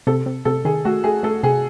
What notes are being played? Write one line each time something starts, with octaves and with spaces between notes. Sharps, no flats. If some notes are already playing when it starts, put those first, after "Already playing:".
C3 A4
C3
C3 A4
D#3 G#4
A3 F#4
A3 G#4
A3 A4
C3 G#4